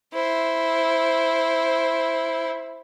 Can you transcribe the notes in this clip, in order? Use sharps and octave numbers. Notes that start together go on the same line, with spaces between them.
E4 C5